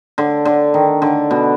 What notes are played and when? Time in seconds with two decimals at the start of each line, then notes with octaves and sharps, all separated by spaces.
0.18 D3
0.45 D3
0.74 D#3
1.02 D3
1.31 B2